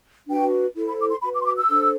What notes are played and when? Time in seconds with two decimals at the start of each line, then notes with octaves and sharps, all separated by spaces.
0.28 D4 F#4 B4 G5
0.76 E4 A4 C5
0.88 B5
1.00 D6
1.11 C6
1.23 F#4 B4 B5
1.35 D6
1.42 C6
1.46 D6
1.58 E6
1.69 D4 A4 C5